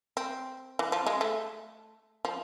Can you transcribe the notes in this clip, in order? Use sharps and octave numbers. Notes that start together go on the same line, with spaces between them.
C4
E3
F3
G#3
A3
F3